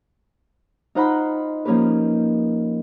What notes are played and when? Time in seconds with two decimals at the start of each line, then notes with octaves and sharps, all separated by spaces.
0.95 D#4 F4 C5 F#5 A#5 B5
1.65 F3 A#3 C#4 D#4 G4 B4